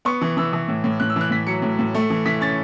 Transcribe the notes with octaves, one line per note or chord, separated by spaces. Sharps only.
B3 C#6
E3
E3 E6
E3
A2
A2
A2 F#6
E6
E3 F#6
A2 B6
F#3 C#7
A2
A2
A3
E3
E3 B6
C#4 A6